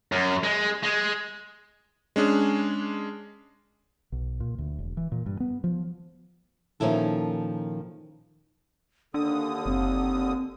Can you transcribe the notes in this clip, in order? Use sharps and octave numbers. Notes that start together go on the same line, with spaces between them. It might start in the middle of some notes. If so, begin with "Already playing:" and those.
F#2
G#3
G#3
G#3 C#4 D4 G#4
B1
A#2
D2
E1
E3
A#2
G2
B3
F3
A#2 D#3 F3 C#4 E4 A4
D#2 D3 D4 A4 D#6
F#1 C4